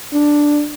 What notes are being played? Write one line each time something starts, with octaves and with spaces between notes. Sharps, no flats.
D4